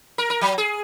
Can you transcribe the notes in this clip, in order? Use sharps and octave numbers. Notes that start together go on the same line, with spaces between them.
A#4
A#4
F#3
G#4